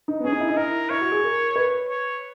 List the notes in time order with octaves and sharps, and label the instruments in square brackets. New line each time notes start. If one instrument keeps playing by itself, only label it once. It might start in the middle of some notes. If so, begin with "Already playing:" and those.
[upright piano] D#4
B3
[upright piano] C#4 [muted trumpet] G#4
[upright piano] D#4
E4
D#4
[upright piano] E4 [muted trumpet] A#4
[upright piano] E4 [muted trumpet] C#5
[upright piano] F#4
G#4
A#4
B4
[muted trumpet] C#5